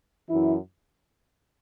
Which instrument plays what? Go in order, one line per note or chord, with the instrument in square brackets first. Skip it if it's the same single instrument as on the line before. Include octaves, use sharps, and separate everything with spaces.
[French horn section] F#2 E3 E4